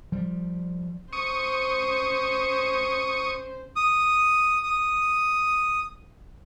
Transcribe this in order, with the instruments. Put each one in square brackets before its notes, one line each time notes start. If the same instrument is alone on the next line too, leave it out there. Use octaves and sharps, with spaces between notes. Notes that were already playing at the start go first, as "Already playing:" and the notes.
[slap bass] F3 G3
[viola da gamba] C#4 C5 [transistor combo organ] C#6 D#6
[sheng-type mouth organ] D#6
D#6